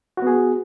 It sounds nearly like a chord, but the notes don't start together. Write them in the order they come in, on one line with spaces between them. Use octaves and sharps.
F#4 B3 G#4